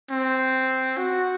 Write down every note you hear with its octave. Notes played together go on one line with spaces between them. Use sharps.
C4
F#4